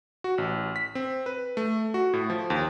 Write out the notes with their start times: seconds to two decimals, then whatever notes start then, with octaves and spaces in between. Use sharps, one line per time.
0.24 F#4
0.38 A1
0.76 B6
0.95 C4
1.26 B4
1.57 A3
1.94 F#4
2.13 A2
2.30 F3
2.50 D#2